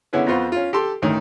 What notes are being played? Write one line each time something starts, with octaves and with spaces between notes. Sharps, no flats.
D3 B3 C#4 E4 G#4 B4
F2 B3 F4 C5 C#6
C#4 F4
G4 A4 C6
D2 A2 D#3 C#4